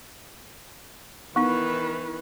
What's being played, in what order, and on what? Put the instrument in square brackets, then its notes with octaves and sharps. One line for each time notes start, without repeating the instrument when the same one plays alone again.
[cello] D#3 E3 [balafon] B3 D#4 [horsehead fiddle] E4 B4 [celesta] C#6